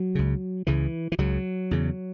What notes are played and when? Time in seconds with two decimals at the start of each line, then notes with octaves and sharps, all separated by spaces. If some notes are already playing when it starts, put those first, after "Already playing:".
Already playing: F#3
0.15 C#2 C#3
0.67 C#2 C#3 E3
1.12 E3
1.18 C#2 C#3 F#3
1.71 E2 C#3